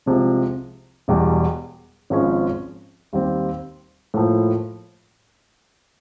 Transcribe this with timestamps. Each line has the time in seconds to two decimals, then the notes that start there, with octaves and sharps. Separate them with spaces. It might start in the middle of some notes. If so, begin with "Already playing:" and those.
0.06 C2 C3 F3 G#3
1.08 E1 E2 B2 G3
2.10 G#1 G#2 F3 G#3 C#4
3.13 D#2 D#3 G3 C4
4.14 A2 F3 A#3